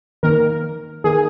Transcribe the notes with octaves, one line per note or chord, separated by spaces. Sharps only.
D#3 A#3 A#4
D#3 A#3 G#4